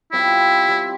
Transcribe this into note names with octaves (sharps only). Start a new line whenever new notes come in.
G3 C4 E4 F4
G3 C4 G4 D5